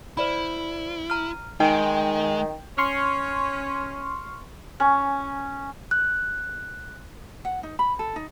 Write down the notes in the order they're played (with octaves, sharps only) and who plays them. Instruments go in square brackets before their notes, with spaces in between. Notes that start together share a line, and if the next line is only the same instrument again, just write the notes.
[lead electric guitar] E4 [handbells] C5 D5 B5
[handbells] A#5 F6
[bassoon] D#3 [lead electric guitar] G#3 [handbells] D#4 G#5 D7 [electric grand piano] G5
[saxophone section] C#4 [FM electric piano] C6 C#6 F6
[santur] C#4
[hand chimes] F#6
[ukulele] F#5
D#4
B5
A4
D#4